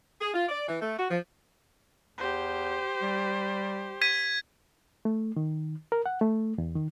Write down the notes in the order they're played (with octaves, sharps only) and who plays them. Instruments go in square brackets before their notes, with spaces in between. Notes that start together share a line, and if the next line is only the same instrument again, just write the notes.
[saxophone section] G#4
F4
D5
E3
A3
F#4
F3
[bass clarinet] E2 [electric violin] G4 C5
[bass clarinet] G3
[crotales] G#6 B6 D#7
[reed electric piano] A3
D#3
A#4
F#5
A3
E2
D#3